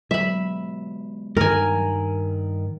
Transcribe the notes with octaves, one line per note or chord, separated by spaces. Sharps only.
F#3 G#3 B3 E5 B5
G2 D#3 A#4 G#5